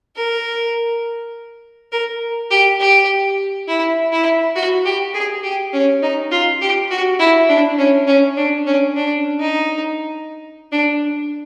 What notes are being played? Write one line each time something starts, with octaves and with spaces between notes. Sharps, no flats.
A#4
A#4
G4
G4
E4
E4
F#4
G4
G#4
G4
C#4
D#4
F4
G4
F#4
E4
D4
C#4
C#4
D4
C#4
D4
D#4
D4